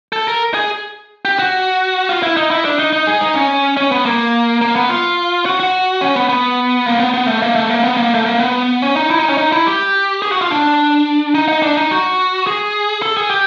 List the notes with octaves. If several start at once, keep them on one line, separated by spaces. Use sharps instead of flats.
A4
A#4
G#4
G4
F#4
F4
E4
D#4
E4
D4
D#4
D#4
G#4
D#4
C#4
C#4
B3
A#3
A#3
B3
F4
F#4
F#4
C#4
B3
B3
A#3
B3
B3
A3
A#3
A3
A#3
B3
A#3
A3
A#3
B3
C#4
D#4
E4
D#4
C#4
D#4
E4
G4
G#4
F#4
F4
D4
D#4
D#4
D4
D#4
F#4
G#4
A4
G#4
G4